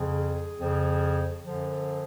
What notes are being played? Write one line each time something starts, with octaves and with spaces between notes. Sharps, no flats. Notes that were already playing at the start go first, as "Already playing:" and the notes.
Already playing: F2 C#3 F3
G#4
F2 C#3 F3
F#2 D3 F3